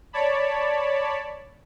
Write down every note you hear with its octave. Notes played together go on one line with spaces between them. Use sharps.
C#5 D5 A5 B5